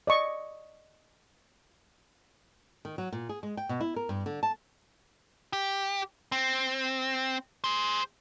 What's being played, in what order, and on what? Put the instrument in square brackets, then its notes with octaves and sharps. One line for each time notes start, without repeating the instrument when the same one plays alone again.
[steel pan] D5 D#5 C#6
[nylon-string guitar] D#3
F#3
A#2
G#4
G#3
G5
B2
E4
A#4
G2
D3
A5
[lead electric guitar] G4
C4
G#4 C5